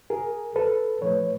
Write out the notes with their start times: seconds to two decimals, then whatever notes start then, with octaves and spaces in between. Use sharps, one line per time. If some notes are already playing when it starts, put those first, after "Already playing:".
0.10 G#4 A#4
0.56 A4 B4
1.01 A#2 F3 A3 B4 C#5